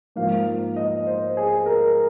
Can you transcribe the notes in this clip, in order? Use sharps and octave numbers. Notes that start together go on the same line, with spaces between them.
G#2 F3 A#3 F5
D#5
C5
G#4
A#4